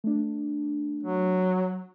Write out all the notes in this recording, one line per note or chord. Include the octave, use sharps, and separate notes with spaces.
A3 D4
F#3